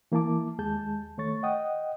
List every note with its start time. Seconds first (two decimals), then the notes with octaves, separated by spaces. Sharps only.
0.12 E3 A#3 E4 A5 D6
0.59 D#2 G#3 G#4 A5 G6
1.18 D#3 A3 C#5 C#6 A6
1.43 D#5 F#5 G5 D#6